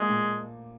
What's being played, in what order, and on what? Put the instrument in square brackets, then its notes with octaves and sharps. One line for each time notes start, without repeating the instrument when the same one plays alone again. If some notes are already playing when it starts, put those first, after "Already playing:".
Already playing: [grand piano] F3 A#3 [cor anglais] G#3
[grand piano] A#2